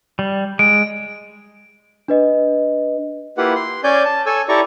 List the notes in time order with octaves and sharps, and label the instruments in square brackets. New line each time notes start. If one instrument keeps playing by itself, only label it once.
[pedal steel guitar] G3
[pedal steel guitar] G#3 [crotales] D7
[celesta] D4 B4 D#5
[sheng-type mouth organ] A#3 E4 F4 G4 B4 F#5
C6
C#4 C#5 D5 G#5 G6
A5
A4 C#5 G#5 E6
E4 G4 A4 D5 A#5 C#6